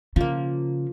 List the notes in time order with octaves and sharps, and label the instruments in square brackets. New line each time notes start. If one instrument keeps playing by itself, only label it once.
[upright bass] C#3 [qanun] F3 A#3